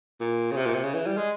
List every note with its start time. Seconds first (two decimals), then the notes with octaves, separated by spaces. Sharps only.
0.20 A#2
0.52 C#3
0.57 C3
0.66 A#2
0.74 C3
0.84 C#3
0.94 E3
1.06 G3
1.17 G#3